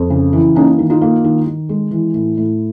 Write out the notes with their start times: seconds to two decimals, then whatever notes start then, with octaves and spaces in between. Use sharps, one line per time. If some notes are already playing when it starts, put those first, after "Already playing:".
Already playing: F2
0.10 C#3
0.33 E3
0.55 A#3 C#4 D#4
0.79 D#3
0.90 D#4 F4
1.01 A#3
1.24 D#3
1.46 D#3
1.69 G#3
1.91 E3
2.14 A2
2.37 A2